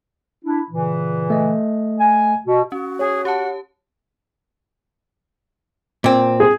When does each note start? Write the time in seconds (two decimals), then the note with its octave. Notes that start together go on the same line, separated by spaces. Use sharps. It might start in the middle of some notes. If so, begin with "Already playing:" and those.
0.45 D4 E4
0.71 A#2 C#3 E3
1.30 A3 D#5
1.99 G#5
2.46 B2
2.72 C#4 F#4
2.99 G#4 C#5
3.25 G4 F#5 A5
6.04 A#2 C4
6.40 G#4